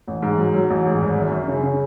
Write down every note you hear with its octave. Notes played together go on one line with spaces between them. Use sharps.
A1
G#2
F#3
F#3
A1
G#2
G#1
F#2
F#2
C#3
C#3